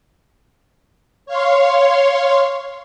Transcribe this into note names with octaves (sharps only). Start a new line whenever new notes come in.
C#5 F5 C6